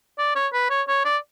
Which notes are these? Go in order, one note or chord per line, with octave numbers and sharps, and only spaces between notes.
D5
C#5
B4
C#5
C#5
D5